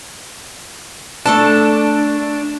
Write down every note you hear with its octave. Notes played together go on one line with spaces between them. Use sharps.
A3 D4 A4 A5